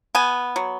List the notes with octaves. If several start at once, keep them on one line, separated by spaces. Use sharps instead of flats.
B3 G#5
F#3